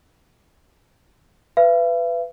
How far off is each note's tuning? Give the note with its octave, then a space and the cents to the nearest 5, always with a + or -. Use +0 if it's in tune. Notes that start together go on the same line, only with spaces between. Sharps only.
B4 +15 E5 +45